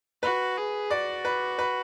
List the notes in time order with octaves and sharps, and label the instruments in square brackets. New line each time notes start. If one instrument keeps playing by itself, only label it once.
[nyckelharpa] F#4 [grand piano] B4
[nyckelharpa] G#4
[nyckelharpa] F#4 [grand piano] D5
[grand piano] B4
B4